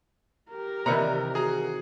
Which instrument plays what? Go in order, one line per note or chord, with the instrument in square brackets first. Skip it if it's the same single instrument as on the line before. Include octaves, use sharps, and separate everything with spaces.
[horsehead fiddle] G4 A#4
[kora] C3 D#3 E3 [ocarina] D5 [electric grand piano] A#5 C#7
[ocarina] F#4 [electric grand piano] G#4 A#5